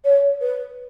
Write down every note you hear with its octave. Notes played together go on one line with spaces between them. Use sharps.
C#5
B4